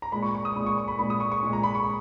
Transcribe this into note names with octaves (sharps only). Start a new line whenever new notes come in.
A#5
A#2 G#3 B5
C#6
C#6
D#6
A#2 G#3 B5
C#6
C#6
B5
A#2 G#3 B5
D#6
C#6
C#6
A#2 G#3
A#5
B5
C#6